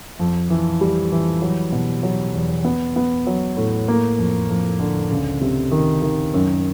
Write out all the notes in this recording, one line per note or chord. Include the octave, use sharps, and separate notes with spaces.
F2
E3
G3
E3
F#3
B2
F#3
E2
B3
B3
F#3
A2
A#3
F2
F2
D3
C#2
C3
D#3
D#3
F#2